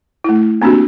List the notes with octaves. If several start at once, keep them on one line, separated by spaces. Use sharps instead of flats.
A3 E4
A#3 C4 D4 F#4 G4